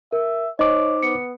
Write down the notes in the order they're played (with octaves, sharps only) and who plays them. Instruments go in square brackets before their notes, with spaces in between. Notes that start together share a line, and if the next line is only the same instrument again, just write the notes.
[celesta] A#4 [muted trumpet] E5
[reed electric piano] D#4 C5 D6 [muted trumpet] C#5 [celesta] D#5
[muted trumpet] B3 [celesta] C#7